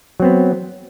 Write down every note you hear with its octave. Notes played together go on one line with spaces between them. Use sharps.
F#3 B3 C4